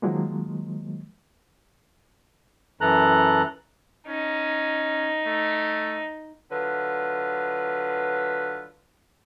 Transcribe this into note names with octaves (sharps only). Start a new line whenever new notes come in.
D#3 F3 F#3 G#3 A#3
F#2 E3 A4 A#5 F#6
C#4 D#4
A3
D3 F#3 F4 B4